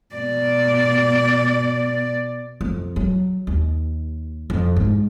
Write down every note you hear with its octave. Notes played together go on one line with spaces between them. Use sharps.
B2 D5
F2
F#3
D#2
F2
G#2